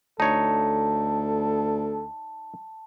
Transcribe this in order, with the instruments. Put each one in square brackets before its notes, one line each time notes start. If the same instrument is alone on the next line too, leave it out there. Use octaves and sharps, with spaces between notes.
[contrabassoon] D2 [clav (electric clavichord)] D#4 C#5 [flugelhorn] A4 [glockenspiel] A5